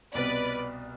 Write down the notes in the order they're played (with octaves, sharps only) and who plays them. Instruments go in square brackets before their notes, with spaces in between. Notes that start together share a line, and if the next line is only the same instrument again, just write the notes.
[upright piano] C2 B2 B3 [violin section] B4 D5